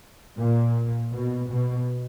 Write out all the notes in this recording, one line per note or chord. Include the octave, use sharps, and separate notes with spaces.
A#2
B2
B2